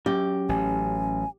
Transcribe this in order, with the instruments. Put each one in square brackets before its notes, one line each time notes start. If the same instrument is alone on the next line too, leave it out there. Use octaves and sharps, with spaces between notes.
[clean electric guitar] F#2 [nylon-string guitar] G4
[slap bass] A1 [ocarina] G#5